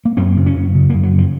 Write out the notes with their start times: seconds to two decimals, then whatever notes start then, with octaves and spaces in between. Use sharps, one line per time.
0.05 A#3
0.17 F#2 C4
0.37 C#3
0.46 C#4
0.56 F#2
0.75 C#3
0.90 A#3
0.94 F#2
1.03 F#3
1.13 C#3
1.18 F3